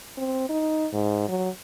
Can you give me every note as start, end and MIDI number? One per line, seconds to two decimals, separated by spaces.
0.17 0.46 60
0.49 0.88 63
0.93 1.24 44
1.28 1.49 54